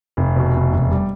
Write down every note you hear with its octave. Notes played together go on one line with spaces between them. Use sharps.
F1
B2
F1
E1
G3